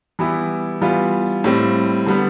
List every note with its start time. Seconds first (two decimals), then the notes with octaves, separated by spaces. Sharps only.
0.19 E3 G3 B3 E4 G4
0.81 E3 G3 B3 F4
1.44 A2 G3 C4
2.07 D3 G3 B3